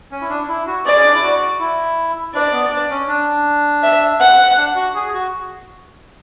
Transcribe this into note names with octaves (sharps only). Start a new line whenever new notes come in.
C#4
E4
D4
E4
F#4
G#4 D5
C#4
D4
E4
F#4
E4
D4 D5
B3
D4
C#4
D4
E5
F#5
D4
F#4
G#4
F#4